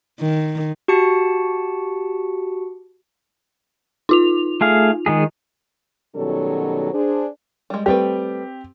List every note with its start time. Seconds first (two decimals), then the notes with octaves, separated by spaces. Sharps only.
0.21 D#3
0.88 F#4 G4 A5 C#7
4.09 D#4 F4 F7
4.61 A3 G#4 F5
5.06 D#3 G#3 G#4
6.15 B2 D#3 F#3 G3 C#4 A4
6.92 D4 G#4 C5
7.70 G3 G#3
7.86 G3 A3 C4 G4 B4